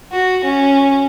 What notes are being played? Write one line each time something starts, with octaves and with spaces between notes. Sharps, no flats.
F#4
C#4